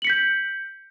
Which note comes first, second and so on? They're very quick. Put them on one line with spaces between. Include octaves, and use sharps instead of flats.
F#7 C#7 B6 G6